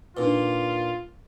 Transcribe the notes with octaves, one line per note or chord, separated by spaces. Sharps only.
A#2 D4 D#4 F4 B4